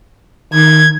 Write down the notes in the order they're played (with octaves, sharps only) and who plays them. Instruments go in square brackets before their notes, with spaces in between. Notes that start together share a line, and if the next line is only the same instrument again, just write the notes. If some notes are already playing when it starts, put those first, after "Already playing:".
[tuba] D#3 [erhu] G#6